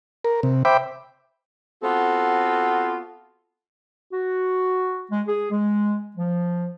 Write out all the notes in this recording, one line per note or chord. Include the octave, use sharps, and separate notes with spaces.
A#4
C3
C5 E5 G5 B5 D6
B3 C4 F4 F#4 A4
F#4
G#3
G#4
G#3
F3